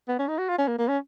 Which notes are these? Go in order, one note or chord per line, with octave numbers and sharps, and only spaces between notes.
B3
C#4
D#4
F#4
F4
C#4
A#3
A#3
C#4